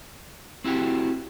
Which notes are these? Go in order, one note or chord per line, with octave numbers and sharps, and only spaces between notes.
C4 E4 F#4 G4